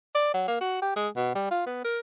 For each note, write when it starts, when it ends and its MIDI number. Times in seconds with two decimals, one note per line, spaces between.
0.15 0.32 74
0.34 0.43 54
0.48 0.57 58
0.61 0.82 66
0.82 0.92 67
0.96 1.08 56
1.16 1.32 47
1.35 1.47 55
1.51 1.63 65
1.66 1.81 59
1.84 1.99 70